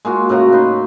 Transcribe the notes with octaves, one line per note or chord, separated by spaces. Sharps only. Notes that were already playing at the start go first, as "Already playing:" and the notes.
G#3 A#3 F4 F#4
A2 C#3 F#4 A#5
D#4 B4 C6